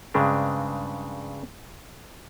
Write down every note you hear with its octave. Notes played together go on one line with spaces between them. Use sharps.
G2 C#3 G#3 C4 D4